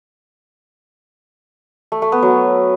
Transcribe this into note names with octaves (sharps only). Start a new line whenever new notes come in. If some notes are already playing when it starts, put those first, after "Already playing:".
A3
A3
B3
F#3